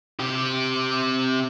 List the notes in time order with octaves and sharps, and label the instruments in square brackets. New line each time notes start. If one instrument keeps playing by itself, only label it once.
[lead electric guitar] C3 G4